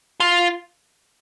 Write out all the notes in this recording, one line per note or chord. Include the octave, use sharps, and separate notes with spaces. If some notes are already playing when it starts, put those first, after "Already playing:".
F4